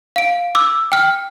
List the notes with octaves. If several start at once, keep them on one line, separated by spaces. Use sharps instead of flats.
F5 D7
D6 E6
G5 F6